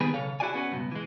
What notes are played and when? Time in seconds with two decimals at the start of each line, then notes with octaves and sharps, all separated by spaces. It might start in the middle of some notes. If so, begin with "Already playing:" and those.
0.01 D#3 G3 G#3 B3 G#4 B4
0.14 B1 C#3 A4 C#5 F5
0.40 E4 F#4 G#4 D5 G#5
0.54 B3 C#4 F#4
0.72 C#2 G2 B2
0.92 E3 G#3